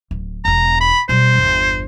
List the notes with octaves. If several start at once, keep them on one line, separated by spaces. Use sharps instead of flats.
D1
E1 E2 A#5
B5
B2 G3 C5
G1 E2